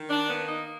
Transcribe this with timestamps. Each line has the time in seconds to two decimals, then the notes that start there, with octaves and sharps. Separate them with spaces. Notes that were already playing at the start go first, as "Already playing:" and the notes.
Already playing: D#3
0.10 D4
0.29 A#3 B3
0.48 D#4